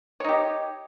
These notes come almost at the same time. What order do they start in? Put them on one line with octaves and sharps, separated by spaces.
C#5 D#4 G4